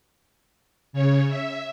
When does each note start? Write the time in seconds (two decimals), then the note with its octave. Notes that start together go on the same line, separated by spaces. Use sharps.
0.93 C#3 C#5
1.28 E5